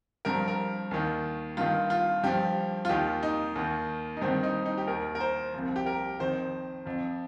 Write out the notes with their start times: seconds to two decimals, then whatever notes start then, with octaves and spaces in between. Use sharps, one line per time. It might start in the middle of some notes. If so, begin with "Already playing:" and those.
0.25 G2 F3 A#4
0.48 A#4
0.91 D#2 D#3
1.57 G2 D#3 F4
1.90 F4
2.23 G2 F3 G4
2.85 F4
2.89 D#2 D#3 G4
3.23 D#4
3.55 D#2 D#3
4.17 D#4
4.21 G2 D#3 C4
4.43 D#4
4.66 D#4
4.78 G4
4.87 D#2 D#3 A#4
5.15 A#4
5.20 C5
5.54 C2 C3 F3
5.76 G4
5.86 A#4
6.20 F2 D#3 C5
6.86 F2 F3